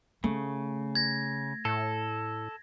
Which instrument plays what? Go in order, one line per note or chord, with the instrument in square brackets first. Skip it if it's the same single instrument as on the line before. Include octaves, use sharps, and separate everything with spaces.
[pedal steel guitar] C#3 [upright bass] A3
[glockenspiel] G#6 A#6
[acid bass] A2 [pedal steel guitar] A4